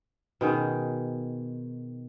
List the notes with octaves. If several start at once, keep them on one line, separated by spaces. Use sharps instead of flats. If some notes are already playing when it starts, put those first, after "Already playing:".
B2 D#3 G#4